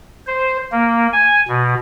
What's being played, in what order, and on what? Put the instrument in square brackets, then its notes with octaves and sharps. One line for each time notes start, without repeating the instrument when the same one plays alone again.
[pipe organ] C5
A#3
G#5
B2